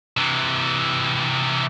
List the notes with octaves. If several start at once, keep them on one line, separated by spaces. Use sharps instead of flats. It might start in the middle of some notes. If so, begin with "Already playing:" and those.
C3 E3